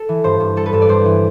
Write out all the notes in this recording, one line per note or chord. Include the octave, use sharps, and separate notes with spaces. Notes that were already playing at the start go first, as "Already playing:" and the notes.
Already playing: A4
E3
G2 C5
G2
G3 A4
B4
G2 A4
D5
G2 C5
E3